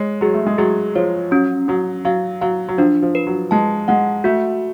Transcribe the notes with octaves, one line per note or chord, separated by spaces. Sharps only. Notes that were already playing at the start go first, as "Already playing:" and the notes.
Already playing: G#3 C#5
F#3 G#4
A3
G#3
F#3 G#4
F3 C#5
F#3 C#4
F#3 C#4
F#3 F5
F#3 F5
F#3
F3 D4
F3
B4
F#3
G#3 A5
G#3 F#5
A3 F#4